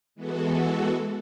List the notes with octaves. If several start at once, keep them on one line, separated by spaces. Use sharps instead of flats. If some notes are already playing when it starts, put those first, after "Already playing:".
E3 G#3 B3 F#4 A4